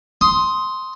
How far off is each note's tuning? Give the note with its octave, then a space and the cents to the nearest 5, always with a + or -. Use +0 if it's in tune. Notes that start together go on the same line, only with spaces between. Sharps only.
C6 +0 D#6 +15